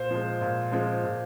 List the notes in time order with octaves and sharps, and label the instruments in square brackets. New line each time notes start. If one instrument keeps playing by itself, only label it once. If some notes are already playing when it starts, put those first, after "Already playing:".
Already playing: [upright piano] A#2 [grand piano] C5
[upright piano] F3 G#3
A#2
F3 G#3
A#2